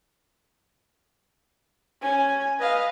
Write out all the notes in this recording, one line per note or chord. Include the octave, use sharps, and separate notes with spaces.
C#4 G#5
B4 D#5 F5